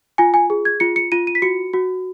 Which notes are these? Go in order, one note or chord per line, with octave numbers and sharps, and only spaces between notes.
F4 G#5
G#5
G#4
G#6
F4 C#7
C#7
F4 D#7
D#7
B6
F#4 C#7
F#4